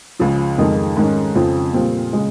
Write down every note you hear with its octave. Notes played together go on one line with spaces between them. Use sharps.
C#2 C#3 F3
F2 D#3 G#3 D#4
G#2 D#3 G#3 C#4
F2 C#3 F3 C4 F4
A#2 G3 C4 F4
C#3 G#3